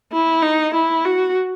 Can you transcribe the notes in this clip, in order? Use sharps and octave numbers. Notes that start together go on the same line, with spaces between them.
E4
D#4
E4
F#4